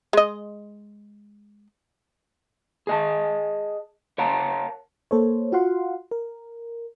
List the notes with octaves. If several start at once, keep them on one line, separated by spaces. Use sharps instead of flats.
G#3 D#5
G#4 D#5 A5
A#4 C#5 F5 F#5 A5 A#5
A#3 A4 C5 C#5
F4 F#4 F5 F#5 C6
A#4